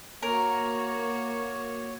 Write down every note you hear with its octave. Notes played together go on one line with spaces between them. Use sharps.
A#3 F#4 A#4 C#5